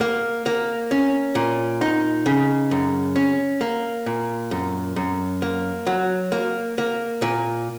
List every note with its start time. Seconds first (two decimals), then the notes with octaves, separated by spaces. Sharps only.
0.01 A#3
0.46 A#3
0.91 C#4
1.35 A#2
1.81 D#4
2.26 C#3
2.71 F#2
3.16 C#4
3.61 A#3
4.06 A#2
4.51 F#2
4.96 F#2
5.42 A#3
5.87 F#3
6.32 A#3
6.78 A#3
7.22 A#2